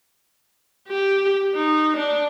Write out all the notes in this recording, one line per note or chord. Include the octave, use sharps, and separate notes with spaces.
G4
D#4
D4